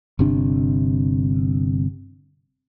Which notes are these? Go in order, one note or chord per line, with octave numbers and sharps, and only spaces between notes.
G1 C3 D4